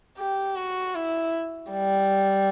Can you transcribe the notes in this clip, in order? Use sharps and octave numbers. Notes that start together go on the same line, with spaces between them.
G4
F#4
E4
G3